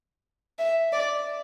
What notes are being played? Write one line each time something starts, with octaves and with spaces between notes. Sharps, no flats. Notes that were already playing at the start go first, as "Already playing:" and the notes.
E5
D5